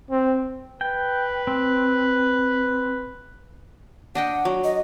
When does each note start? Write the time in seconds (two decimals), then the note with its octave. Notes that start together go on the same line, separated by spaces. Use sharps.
0.10 C4
0.81 B4 G5
1.47 C4
4.15 D4 D#5 F#5 G5
4.45 F#3
4.64 D#5